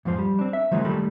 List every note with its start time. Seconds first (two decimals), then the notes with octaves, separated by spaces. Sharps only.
0.05 F2 G#2 F3 C5
0.19 G3
0.39 C4 D4
0.53 E5
0.71 D#3 F3 F#3 G#3 A#3 D#4
0.84 D#3 G3 A3 A4 B5